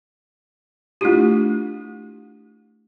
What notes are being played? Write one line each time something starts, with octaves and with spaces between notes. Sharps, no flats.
A3 D4 E4 F4 G4